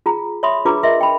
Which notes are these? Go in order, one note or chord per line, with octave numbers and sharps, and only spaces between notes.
F4 G#4 A#5
C#5 E5 B5 C6 D#6
D4 F4 G#4 B4 A#5 D6
A#4 D#5 E5 C6
G5 B5